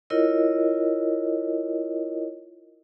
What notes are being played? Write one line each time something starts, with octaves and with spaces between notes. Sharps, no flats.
E4 F4 A#4 C#5 D#5